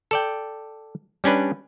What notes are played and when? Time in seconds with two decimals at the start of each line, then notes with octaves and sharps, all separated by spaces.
0.11 A4 D5 G5
1.24 G3 C#4 D4 B4